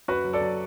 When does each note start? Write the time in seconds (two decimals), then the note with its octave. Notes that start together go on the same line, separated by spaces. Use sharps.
0.08 F#2 F#4 B4
0.24 F#3
0.33 A4 D5
0.41 F#3